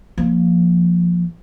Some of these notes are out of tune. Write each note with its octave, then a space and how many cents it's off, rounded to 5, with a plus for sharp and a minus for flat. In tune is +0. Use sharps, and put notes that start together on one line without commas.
F3 +0 A#3 +0